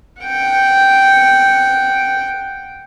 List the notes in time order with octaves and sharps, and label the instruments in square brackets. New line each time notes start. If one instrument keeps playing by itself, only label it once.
[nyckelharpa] F#5 G5